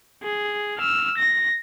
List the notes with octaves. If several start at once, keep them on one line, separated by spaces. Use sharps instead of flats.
G#4
E6 F6
A#6